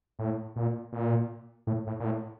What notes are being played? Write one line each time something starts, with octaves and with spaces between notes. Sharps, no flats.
A2
A#2
A#2
A2
A2
A#2
A2